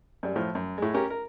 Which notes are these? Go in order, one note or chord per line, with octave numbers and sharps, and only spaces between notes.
F#2 G3
A2 F3
F#2
A2 G#3
C#4 G4 A#4
A#4